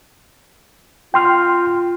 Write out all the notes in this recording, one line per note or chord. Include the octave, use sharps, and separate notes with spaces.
F4 G5 C6 F6